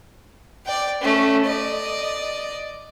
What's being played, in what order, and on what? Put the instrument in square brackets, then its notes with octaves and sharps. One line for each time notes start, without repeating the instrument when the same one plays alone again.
[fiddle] D5 G5
A3 C#4
D5 D#5